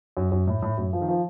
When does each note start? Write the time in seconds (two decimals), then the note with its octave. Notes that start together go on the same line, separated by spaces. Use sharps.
0.17 F#2
0.32 F#2
0.47 A2
0.62 A2
0.78 F#2
0.93 F3
1.01 D#3
1.08 F3